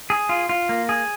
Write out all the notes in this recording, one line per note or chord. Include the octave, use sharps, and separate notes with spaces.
G#4
F4
F4
A#3
G#4